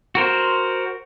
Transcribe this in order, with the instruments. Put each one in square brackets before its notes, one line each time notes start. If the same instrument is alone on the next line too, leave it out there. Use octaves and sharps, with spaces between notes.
[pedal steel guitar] F#4 A#4 C5